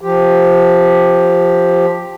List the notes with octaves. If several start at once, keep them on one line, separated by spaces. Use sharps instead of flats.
F3 G4